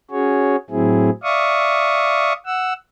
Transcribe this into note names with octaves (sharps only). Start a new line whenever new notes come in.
C#4 F#4 G#4 C#5
A2 F#3 C4 E4 G#4
D5 E5 F5 C#6 D#6
F#5 E6